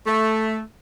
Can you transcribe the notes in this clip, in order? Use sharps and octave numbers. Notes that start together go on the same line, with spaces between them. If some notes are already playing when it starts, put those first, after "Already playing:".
A3